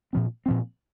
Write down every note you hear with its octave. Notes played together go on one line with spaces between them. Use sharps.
A#2 F3 C4
A#2 F3 C4